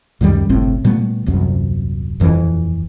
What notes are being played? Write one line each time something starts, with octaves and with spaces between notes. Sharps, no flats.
C#2 F#2 D#3 G3
G1 C2 A2 C4
A#2 G3 A3 B3
D#1 C2 F#2
D#1 F2 E3